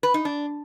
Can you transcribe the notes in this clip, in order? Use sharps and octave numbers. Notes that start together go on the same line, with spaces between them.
B4
D#4
D4